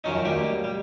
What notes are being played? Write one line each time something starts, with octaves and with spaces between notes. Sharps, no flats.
F#2 D#3 F3 C#4 D#4
D2 G3 A#3 G4
G3